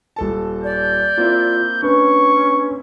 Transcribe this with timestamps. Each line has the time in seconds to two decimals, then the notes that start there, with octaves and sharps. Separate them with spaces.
0.16 D#1 A4 A5
0.64 D5 G6
1.18 A#3 C4 E4 F4
1.83 C#4 D4 B4 C#6